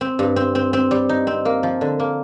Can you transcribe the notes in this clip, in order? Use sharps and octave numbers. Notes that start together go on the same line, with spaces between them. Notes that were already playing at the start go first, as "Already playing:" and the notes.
C4
G2
C4
C4
C4
G3
D#4
C4
A#3
F3
D3
A#3